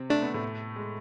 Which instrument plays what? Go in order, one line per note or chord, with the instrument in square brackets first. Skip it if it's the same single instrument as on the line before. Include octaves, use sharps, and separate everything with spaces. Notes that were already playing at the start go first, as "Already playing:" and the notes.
Already playing: [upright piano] C3 C4
[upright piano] A3 [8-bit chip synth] D4
[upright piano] B3
A2 A3
G#3